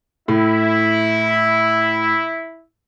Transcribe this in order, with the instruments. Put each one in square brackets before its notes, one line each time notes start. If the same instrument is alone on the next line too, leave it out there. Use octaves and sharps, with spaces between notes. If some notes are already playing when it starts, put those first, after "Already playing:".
[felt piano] A2 [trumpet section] E4